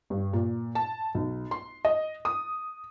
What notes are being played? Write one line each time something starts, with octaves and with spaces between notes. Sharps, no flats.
G2
A#2
A5
B1
C6
D#5
D#6